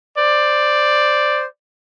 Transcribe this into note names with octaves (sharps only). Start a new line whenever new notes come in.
C5 D5